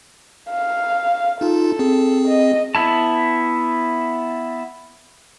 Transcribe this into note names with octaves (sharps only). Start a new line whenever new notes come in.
F5
D#4 F4 A4
C4 G#4
D#5
B3 E4 A5